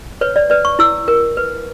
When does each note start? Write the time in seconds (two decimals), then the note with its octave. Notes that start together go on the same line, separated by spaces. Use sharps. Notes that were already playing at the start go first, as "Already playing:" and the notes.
0.21 B4 C#5
0.36 D5
0.50 B4 D5
0.65 C#6
0.79 E4 E6
1.08 A#4
1.37 B4